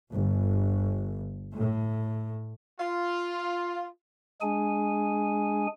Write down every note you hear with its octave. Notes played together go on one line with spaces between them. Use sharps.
G1
A2
F4
G#3 D4 G#4 G#5